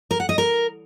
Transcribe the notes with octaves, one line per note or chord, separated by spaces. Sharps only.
A#4
F#5
D#5
A#4